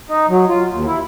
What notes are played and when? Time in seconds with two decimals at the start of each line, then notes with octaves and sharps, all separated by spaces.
0.09 D#4
0.29 F#3
0.49 F4
0.72 D#2
0.87 E4